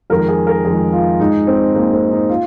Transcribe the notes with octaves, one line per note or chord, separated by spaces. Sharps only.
F2 D#3 G#3 A#4
G#4
A#4
F2 D#3 G#3 G#4
F4
G#2 G#3 D#4
C4
G#2 G#3 A#3
C4
D#4
F4